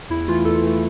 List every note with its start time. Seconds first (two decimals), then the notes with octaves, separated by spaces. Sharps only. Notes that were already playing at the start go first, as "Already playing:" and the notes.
0.10 E2 E4
0.28 E3 A3 F4
0.45 E2 A4
0.63 E3 A3